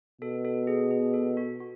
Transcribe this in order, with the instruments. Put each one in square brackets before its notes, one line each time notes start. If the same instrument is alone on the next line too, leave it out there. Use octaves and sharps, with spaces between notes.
[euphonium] B2 [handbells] A4
[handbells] A4
G#4
G#4
A4
F#4
F#4